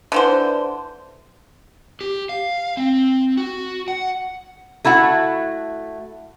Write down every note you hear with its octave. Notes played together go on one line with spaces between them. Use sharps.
D3 E3 C5
G4
F5
C4
F#4
F#5
A3 E4 F#4 F#5